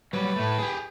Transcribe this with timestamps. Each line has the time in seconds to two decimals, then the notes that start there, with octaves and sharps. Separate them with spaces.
0.13 F#3 G3 B4
0.36 A2 A3
0.58 G4 G#4